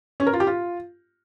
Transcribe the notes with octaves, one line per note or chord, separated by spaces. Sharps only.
C#4
A#4
F4
G4
F4